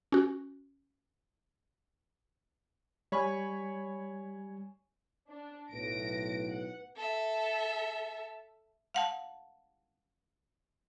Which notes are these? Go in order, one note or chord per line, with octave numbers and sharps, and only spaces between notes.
C#4 F#4
G3 C#5 G#5 B5 C#6
D4
B1 A2 B4 A#6 D7
F#5
A4 E5
F5 F#5 A5